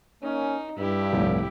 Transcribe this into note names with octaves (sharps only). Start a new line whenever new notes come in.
A#3 C#4 D#4
G2 E4 G4
F1 C2 A2